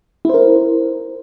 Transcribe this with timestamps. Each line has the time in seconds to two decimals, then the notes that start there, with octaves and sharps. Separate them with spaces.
0.25 E4
0.29 C5
0.34 A#4